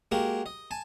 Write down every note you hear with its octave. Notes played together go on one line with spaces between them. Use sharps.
G#3 A#3 F#4 G4 A#4
D#5
G#5 A5